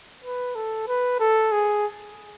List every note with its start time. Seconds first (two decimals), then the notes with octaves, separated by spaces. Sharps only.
0.24 B4
0.55 A4
0.88 B4
1.20 A4
1.52 G#4